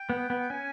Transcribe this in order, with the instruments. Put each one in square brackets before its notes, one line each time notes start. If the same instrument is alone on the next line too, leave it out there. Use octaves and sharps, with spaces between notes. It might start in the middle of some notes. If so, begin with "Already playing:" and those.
Already playing: [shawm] G5
[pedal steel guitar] B3
B3
[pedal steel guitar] C#4 [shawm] G#5